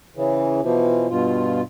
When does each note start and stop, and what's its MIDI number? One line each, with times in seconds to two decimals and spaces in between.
0.16 0.61 49
0.16 0.61 52
0.63 1.07 47
0.63 1.07 52
0.63 1.07 53
1.10 1.61 43
1.10 1.61 47
1.10 1.61 65